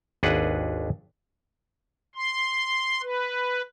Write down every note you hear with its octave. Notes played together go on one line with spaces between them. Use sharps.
G#1 D#2 D4 G#4 B4 F#5
C6
B4